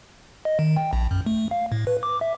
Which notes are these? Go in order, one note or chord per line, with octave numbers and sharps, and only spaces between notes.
D#5
D#3
G5
A#1
F#2
A3
F5
A2
B4
D6
E5